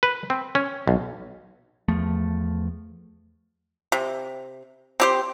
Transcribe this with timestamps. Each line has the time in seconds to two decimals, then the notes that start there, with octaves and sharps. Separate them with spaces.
0.03 B4
0.30 C4
0.55 C#4
0.88 B1
1.88 E2 F3 A3
3.92 C3
5.00 C4 G4 C5